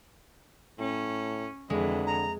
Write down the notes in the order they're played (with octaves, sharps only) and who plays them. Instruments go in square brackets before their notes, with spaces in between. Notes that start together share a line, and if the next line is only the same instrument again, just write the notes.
[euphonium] A2 [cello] C#4
[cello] F2 E3 [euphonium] D3 [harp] G#3
[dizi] A#5